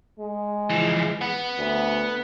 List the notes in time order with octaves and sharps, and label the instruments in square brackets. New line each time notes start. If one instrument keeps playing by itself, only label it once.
[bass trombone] G#3
[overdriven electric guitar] E3 F3
B3
[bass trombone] D2